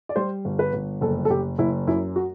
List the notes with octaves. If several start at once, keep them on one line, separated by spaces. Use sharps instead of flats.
D5
G3 C5
G1
B4
G1
F#1 A4
A4
F#1 G4
F#1 E4
F#2 E4
F#4